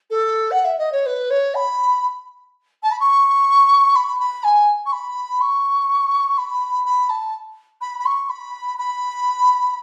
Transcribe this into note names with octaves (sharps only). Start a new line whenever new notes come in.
A4
F#5
E5
D#5
C#5
B4
C#5
B5
A5
B5
C#6
B5
B5
G#5
C#6
B5
C#6
B5
B5
A5
B5
B5
C#6
B5
B5